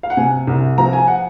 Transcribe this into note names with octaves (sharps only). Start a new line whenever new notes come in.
F5
F#5
C3 G#5
C2
F3 A#5
G#5
F#5